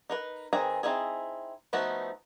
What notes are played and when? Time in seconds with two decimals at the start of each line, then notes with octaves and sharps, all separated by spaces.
0.10 D#4 A#4 B4
0.53 D#3 C4 G#4 B4 A#5
0.83 C4 C#4 D#4 E4 G#4
1.73 F3 A3 B3 D#4 F#4